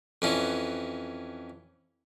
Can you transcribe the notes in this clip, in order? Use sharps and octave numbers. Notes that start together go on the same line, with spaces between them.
F2 E3 C#4